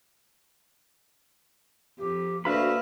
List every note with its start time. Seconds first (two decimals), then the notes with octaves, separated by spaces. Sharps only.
1.99 F2 G4
2.45 D2 A#3 F#4 B4 E5 F5 B5